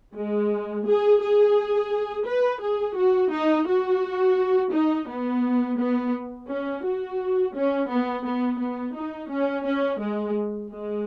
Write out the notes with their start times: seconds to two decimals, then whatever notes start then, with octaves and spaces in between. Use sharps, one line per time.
0.15 G#3
0.87 G#4
1.21 G#4
2.27 B4
2.62 G#4
2.97 F#4
3.32 D#4
3.67 F#4
4.72 D#4
5.08 B3
5.78 B3
6.48 C#4
6.84 F#4
7.55 C#4
7.89 B3
8.25 B3
8.59 B3
8.95 D#4
9.30 C#4
9.66 C#4
10.00 G#3
10.71 G#3